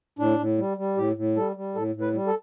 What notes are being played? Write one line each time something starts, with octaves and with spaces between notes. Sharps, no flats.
A2 D4
A2
G3
G3
A2 G4
A2
G3 A4
G3
A2 A4
A2
B4
G3
A4